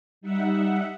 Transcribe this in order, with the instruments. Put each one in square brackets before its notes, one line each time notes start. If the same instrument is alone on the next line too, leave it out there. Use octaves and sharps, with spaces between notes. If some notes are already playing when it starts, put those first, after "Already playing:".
[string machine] G3 D#4 E5 F#5